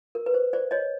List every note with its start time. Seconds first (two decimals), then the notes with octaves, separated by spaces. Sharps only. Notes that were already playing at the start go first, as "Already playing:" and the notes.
0.15 A#4
0.26 B4
0.34 C5
0.53 C5 D5
0.71 C#5 D#5